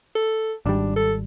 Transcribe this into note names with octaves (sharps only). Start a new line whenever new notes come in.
A4
G#1 G3 D4
A4